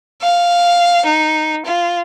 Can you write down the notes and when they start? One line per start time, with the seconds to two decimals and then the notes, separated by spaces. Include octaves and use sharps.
0.22 F5
1.05 D#4
1.65 F4